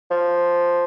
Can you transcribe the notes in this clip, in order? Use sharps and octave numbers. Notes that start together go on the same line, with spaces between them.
F3